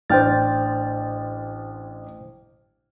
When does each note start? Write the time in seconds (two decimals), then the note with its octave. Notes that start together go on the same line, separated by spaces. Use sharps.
0.10 A1 D4 C5 G5 F6 A6